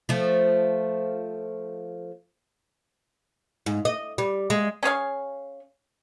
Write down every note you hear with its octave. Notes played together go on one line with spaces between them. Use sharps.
F3 A3
G#2
D#5
G3
G#3
C#4 G#4 C#5 F5